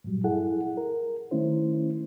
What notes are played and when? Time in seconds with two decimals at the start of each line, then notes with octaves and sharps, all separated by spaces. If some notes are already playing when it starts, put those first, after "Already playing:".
0.04 G2 A#2 F#3 G3
0.24 E4 G#4 A4 F#5
0.77 A#4
1.31 D#3 A3 C#4 E4 C5